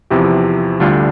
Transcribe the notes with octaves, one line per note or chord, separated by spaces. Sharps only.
E2 C3 F3 E4 G4
D2 D3 G3 D4 F4